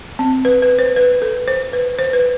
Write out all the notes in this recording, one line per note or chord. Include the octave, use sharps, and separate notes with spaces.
C4
B4
B4
C5
B4
A4
C5
B4
C5
B4